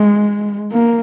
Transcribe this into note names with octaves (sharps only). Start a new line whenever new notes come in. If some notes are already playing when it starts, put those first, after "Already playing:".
Already playing: G#3
A#3